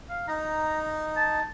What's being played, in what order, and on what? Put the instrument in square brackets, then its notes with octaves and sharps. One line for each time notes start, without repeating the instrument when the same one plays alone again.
[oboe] F5
[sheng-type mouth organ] D#4 [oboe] A#5
[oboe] A5